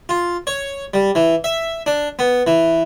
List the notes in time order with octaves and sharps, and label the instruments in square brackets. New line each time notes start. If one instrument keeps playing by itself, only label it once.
[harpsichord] F4
C#5
G3
E3
E5
D4
B3
E3